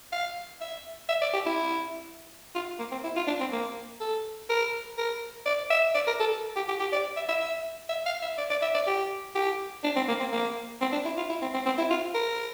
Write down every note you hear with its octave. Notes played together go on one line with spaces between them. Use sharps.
F5
E5
E5
D5
G4
E4
F4
A#3
C4
E4
F4
D4
C4
A#3
A4
A#4
A#4
D5
E5
D5
A#4
A4
G4
G4
G4
D5
E5
E5
E5
E5
F5
E5
D5
D5
E5
D5
G4
G4
D4
C4
A#3
C4
A#3
C4
D4
E4
F4
E4
C4
C4
C4
E4
F4
A#4